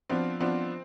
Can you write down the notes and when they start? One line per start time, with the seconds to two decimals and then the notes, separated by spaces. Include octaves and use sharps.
0.09 F3 B3 C4 D4 F4
0.40 F3 B3 C4 D4 F4